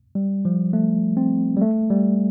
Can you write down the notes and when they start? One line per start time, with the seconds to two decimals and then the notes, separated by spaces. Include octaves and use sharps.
0.15 G3
0.45 F3
0.73 A3
1.17 C4
1.57 G3
1.61 A3
1.90 G3